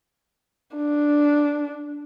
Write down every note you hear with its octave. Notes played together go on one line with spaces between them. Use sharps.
D4